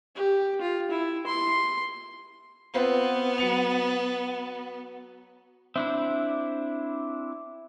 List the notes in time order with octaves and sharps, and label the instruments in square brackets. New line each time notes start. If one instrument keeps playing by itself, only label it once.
[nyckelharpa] G4
F4
E4
C6
[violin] B3 [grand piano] C4 F4 B4
[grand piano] F#3 C#7 F7
[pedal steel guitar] C4 D4 E4 [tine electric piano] E5